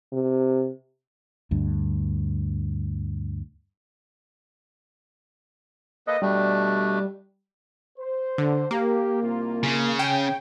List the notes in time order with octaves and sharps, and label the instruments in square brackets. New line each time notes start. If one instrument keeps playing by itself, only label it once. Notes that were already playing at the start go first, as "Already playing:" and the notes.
[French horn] C3
[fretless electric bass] D2 G2
[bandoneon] A#3 A4 B4 [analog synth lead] D#5
[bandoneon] B2 A3 D4 [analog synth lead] G3
[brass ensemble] C5
[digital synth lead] D3
[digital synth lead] A#3 [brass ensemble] G4
[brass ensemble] C2 C3 F4
[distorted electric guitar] C#3
[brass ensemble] G#4 C#5 [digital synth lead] G5